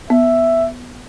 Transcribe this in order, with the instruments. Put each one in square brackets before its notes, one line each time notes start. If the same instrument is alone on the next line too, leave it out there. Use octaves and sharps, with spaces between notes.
[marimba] B3 [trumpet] E5